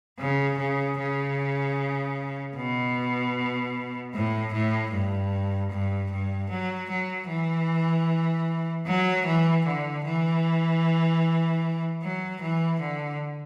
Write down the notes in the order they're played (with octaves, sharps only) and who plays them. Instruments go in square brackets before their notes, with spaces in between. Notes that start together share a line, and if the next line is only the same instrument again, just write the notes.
[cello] C#3
C#3
C#3
B2
A2
A2
G2
G2
G2
F#3
F#3
E3
F#3
E3
D3
E3
F#3
E3
D3